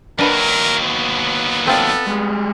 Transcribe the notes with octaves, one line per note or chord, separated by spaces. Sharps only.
D#2 F#3 D4 A#4 B4 F#5
B3
C4 F4 A4 D5
G3 G#3